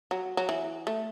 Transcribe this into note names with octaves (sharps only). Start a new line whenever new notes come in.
F#3
F#3
E3
A3